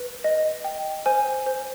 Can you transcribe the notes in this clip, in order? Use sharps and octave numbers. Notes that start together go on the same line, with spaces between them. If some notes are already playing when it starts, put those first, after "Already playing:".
Already playing: B4
D#5
G5
C5 G#5
C5